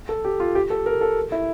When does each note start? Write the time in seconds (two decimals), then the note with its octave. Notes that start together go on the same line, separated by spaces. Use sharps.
0.09 A4
0.25 G4
0.40 F4
0.55 G4
0.70 A4
0.86 A#4
1.01 A4
1.32 E4